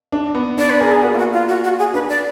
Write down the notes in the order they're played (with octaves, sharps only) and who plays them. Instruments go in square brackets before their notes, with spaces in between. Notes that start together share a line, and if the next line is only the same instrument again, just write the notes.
[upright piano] D4
B3
[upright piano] D4 [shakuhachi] D5
[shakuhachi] B4
[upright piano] G#4 [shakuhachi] A#4
[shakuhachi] G#4
[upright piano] A#3 [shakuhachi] F#4
[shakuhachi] F4
F#4
F4
F#4
F#4
G#4
[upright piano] D4 [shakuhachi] B4
[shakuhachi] D5